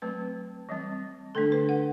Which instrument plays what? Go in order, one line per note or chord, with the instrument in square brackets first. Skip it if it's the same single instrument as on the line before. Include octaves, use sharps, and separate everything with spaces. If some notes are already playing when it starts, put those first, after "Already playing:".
[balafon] F#3 A3 C4 B4
E3 G3 C4
D3 A3 D4 A4
B4
F#5